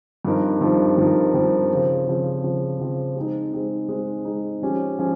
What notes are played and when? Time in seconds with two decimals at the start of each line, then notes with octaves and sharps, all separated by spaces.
0.25 G2 F3 C4 D#4 A#4
0.61 G2 F3 C4 D#4 A#4
0.98 G2 F3 C4 D#4 A#4
1.34 G2 F3 C4 D#4 A#4
1.71 C#3 F3 C4
2.07 C#3 F3 C4
2.43 C#3 F3 C4
2.79 C#3 F3 C4
3.16 G#3 C4 D#4
3.53 G#3 C4 D#4
3.88 G#3 C4 D#4
4.25 G#3 C4 D#4
4.62 F3 G#3 C#4 G4
4.99 F3 G#3 C#4 G4